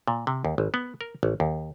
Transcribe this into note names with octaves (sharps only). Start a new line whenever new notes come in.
A#2
C3
D#2
G#1
B3
A#4
A1
D#2